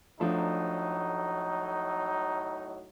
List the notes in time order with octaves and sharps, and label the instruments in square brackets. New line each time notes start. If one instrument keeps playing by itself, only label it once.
[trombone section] A2 F#3 D#4 [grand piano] F3 A3 D4